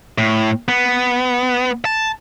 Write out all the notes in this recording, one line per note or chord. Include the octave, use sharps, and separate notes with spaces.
A2
B3
A5